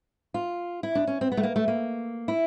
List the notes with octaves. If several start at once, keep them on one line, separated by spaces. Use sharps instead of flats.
F4
E4
D4
C#4
C4
B3
A3
A#3
A3
A#3
E4